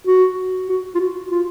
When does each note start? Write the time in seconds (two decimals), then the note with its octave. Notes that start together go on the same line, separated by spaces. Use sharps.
0.07 F#4
0.69 F#4
0.95 F4
1.00 F#4
1.31 F4